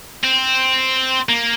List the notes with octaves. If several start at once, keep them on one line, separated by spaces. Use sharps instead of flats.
C4
A#3